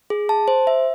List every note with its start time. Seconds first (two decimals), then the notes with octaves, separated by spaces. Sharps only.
0.10 G#4
0.29 A5
0.48 C5
0.67 E5